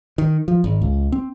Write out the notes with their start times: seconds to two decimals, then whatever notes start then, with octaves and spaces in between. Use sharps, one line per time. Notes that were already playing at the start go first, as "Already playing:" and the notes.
0.18 D#3
0.48 F3
0.64 G#1
0.81 C#2
1.12 C4